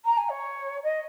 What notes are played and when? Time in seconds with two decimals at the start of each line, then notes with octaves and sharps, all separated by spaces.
0.04 A#5
0.17 G#5
0.30 C#5
0.83 D#5